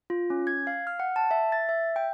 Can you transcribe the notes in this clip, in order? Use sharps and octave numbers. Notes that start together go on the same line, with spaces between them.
F4
C#4
G#6
F5
F6
F#5
A5
E5
A6
E5
G5